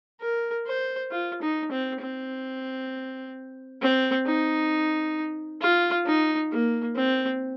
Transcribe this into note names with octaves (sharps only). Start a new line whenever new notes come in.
A#4
C5
F4
D#4
C4
C4
C4
D#4
F4
D#4
A#3
C4